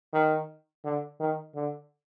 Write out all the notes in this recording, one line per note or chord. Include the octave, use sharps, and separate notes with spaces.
D#3
D3
D#3
D3